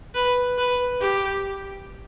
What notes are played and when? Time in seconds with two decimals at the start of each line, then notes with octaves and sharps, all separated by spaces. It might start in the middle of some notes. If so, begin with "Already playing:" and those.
0.15 B4
0.58 B4
1.01 G4